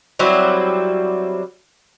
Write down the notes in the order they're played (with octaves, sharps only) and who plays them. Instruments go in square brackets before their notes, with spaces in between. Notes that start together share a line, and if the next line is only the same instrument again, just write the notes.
[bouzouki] F#3 G3 C4 E4